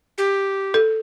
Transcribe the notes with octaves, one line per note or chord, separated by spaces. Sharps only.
G4
A4